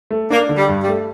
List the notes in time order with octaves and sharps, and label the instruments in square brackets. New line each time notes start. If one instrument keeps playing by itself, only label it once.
[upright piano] A3
[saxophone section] A#3 [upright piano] D4
[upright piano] D3
[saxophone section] G3
[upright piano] G2
[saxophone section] G3
[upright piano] A3